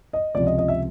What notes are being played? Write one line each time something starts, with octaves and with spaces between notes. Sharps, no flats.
D#5
C#2 C3 F3 D5
D#5
D#5
E5